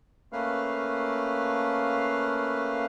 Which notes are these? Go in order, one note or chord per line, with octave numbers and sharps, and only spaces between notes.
A3 A#3 C#4 B4 F5